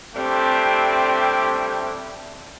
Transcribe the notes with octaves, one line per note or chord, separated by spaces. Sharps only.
G3 A3 C4 D4 E4 G4